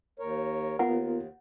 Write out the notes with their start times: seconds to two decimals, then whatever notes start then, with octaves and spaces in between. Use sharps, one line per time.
0.19 D#2 A#4 C#5
0.79 D#2 B3 F4 A#4 F#5